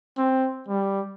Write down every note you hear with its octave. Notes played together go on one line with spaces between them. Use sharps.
C4
G3